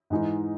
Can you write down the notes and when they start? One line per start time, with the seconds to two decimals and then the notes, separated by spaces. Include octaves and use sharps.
0.10 G#2 E3 G#3 D#4